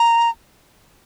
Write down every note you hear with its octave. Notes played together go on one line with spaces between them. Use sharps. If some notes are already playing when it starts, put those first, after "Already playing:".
Already playing: A#5